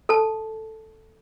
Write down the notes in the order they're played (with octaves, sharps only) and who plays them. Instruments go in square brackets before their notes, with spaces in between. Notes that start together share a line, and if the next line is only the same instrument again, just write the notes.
[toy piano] A4 A5